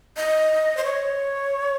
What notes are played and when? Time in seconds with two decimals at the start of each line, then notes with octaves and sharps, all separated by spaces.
0.17 D#5
0.77 C5
0.84 C#5